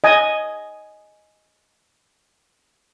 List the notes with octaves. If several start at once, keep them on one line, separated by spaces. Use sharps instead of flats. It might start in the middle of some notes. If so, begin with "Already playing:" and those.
D#5 G#5